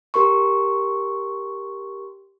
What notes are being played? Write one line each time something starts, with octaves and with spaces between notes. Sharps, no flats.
G4 A#4 C6 C#6